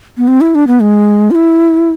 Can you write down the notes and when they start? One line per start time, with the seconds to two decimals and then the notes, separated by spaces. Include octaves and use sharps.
0.18 B3
0.28 C4
0.41 E4
0.55 D4
0.67 B3
0.82 G#3
1.31 F4
1.35 E4